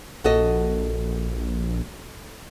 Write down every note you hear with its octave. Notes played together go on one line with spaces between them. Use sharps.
A#1 F#4 A4 D#5